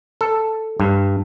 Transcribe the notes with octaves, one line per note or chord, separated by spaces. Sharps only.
A4
G2